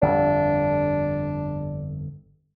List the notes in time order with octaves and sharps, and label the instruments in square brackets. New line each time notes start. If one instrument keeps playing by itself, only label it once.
[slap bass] G1 F2 [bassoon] D4